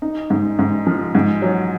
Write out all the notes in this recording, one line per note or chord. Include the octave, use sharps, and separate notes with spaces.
D#4
G#2
G#2
F3
G#2
F#3